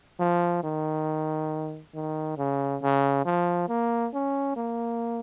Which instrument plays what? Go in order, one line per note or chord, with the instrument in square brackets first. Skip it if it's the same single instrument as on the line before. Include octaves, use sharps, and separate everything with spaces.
[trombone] F3
D#3
D#3
C#3
C#3
F3
A#3
C#4
A#3